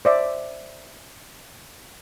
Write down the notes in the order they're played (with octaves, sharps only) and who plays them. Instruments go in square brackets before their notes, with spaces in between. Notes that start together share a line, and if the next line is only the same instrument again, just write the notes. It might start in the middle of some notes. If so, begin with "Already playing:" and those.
[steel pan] C5 D5 E5